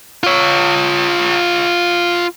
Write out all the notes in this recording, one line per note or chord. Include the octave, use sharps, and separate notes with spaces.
F4 C#5